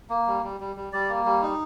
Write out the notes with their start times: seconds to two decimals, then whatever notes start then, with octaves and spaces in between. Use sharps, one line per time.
0.10 A#3
0.27 G3
0.43 G3
0.60 G3
0.76 G3
0.92 G3 D5
1.09 A#3
1.26 G3
1.42 D#4